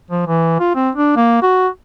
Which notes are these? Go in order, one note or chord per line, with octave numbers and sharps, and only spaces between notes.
F3
E3
F4
C4
D4
A#3
F#4